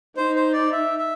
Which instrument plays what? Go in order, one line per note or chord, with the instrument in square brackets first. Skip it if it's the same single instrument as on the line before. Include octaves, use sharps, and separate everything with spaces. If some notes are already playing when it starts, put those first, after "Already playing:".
[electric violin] D#4 [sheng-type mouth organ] C5
[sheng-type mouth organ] C5
D5
E5
E5